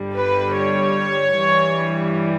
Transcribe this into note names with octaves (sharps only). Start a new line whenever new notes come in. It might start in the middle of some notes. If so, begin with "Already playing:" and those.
Already playing: G1 G2 D3 G3
B4
C#5
G2 E3 G3